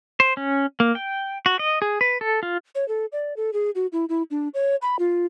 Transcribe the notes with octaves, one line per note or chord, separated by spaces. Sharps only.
C5
C#4
A#3
G5
F#4
D#5
G#4
B4
A4
F4
C#5
A4
D5
A4
G#4
F#4
E4
E4
D4
C#5
B5
F4